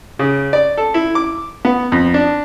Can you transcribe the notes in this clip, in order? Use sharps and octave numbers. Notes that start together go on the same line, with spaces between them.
C#3
D5
A4
E4
D6
B3
F2
D4